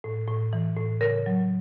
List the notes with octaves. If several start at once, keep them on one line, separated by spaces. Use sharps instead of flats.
A2
A2
E3
A2
C#3 A#4
F#3